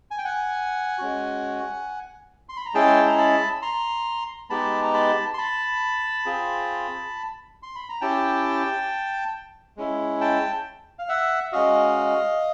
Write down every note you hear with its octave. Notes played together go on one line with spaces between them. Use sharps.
G#5
G5
F#5 G#5
G#3 C#4 F#4
C6
B5
A#5
G#3 C#4 E4 G#4 G5 A5
A#5
A5 B5
A#5 C6
G#3 B3 D#4 G4 A5 B5
A#5
A5 B5
C6
A5 B5
C4 F4 G#4
C6
B5
A#5
C#4 E4 G4 G5 A5
G#3 C#4 E4
G5 A5
F5
E5 F#5
G#3 C#4 F#4 D#5 F5